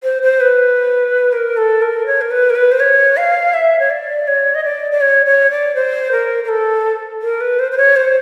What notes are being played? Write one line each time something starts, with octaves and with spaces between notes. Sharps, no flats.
C5
C5
B4
A#4
A4
A#4
C#5
A#4
B4
A#4
B4
C5
C#5
F5
E5
C#5
D5
C#5
D#5
D5
D5
C#5
C#5
D5
C5
A#4
A#4
A4
A#4
B4
C5
C5
C#5
C5